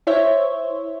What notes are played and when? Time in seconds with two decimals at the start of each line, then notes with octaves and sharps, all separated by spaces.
0.07 E4 C5 C#5 E5